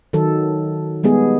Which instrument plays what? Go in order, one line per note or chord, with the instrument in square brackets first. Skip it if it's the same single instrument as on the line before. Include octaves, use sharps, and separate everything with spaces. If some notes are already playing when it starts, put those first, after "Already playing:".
[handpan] D#3 F#3 A4
G3 G#3 B3 G#4